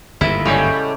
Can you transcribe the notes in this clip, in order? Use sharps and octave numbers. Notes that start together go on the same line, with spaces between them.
G1 D#2 G#2 E4
A2 C#3 G3 G#3